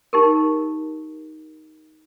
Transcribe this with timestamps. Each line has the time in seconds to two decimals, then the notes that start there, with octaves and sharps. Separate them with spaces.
0.13 D#4 G4 A#4